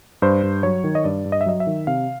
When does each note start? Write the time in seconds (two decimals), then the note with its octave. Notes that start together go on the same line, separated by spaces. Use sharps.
0.22 G2 C5
0.43 G2
0.63 F#3 C#5
0.84 D#3
0.95 D#5
1.04 G2 D5
1.25 G2
1.32 D#5
1.41 E5
1.46 F#3 D#5
1.60 E5
1.67 D#3
1.87 C3 F5